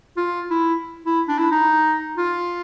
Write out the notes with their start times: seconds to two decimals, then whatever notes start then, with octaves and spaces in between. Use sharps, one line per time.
0.17 F4
0.50 E4
1.06 E4
1.28 D4
1.39 E4
1.51 D#4
2.18 F4